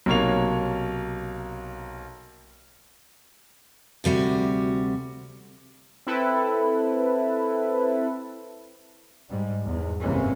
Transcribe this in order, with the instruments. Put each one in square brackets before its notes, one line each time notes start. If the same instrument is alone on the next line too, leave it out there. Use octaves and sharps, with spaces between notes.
[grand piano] B1 C3 A#3 C#5 F5 F7
[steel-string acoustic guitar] D2 C3 G3 F#4
[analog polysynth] C4 E4 A4 B4
[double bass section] G#2 G3
E2 G#2
G#1 F#2 C3 E3 A#3 C#4